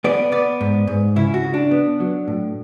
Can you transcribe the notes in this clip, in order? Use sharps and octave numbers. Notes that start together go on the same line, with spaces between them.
B3 D5
B3 D5
G#2
G#2
C#3 E4
F#4
C#3
D4
B3
F#3
A2